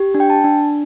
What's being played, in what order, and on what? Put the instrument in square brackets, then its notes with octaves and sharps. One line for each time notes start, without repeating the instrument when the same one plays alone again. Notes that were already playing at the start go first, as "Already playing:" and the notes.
Already playing: [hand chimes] G4
D4
G5
A5
D4